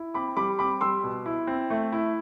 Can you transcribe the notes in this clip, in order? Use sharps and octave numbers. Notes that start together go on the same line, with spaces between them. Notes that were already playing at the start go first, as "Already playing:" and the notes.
Already playing: E4
C4 B5 D6
G3 B5 D6
C4 B5 D6
G3 C6 E6
B2
E4
C4
A3
E4